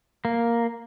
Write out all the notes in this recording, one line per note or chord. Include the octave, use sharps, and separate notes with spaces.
A#3